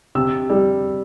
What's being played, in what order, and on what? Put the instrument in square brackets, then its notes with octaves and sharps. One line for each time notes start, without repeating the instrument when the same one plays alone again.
[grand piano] C3 E6
G3